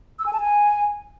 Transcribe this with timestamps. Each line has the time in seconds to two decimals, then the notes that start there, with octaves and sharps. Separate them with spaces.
0.19 E6
0.26 G#5
0.33 A5
0.40 G#5